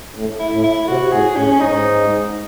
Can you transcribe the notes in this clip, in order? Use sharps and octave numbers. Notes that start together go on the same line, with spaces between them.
A2
E4
A2
E4
C3 F#4
A2 G#4
A2 C#4
C#4
G#2 D#4